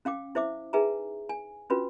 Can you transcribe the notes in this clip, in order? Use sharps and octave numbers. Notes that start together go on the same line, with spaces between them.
C#4 F5 G5 D6
E4 C5 E5 D6
D#4 G#4 B4 E5 G#5 A#5
G#5
C#4 D4 F4 F#4 B4